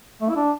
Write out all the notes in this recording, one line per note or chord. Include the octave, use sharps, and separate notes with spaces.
A3
E4
D4